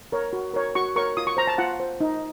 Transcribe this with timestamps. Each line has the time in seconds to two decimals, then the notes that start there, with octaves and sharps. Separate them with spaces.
0.12 A#4 C#5
0.33 F#4
0.54 A#4 C#5
0.75 F#4 C#6
0.96 A#4 C#5 C#6
1.17 F4 D#6
1.27 C#6
1.37 C5 A#5
1.47 A5
1.58 F4 F#5
1.80 C5
2.01 D#4